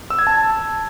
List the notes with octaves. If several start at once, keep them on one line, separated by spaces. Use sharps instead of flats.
E6
G#6
A5